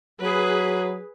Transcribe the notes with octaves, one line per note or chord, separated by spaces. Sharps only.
F#3 G#4 B4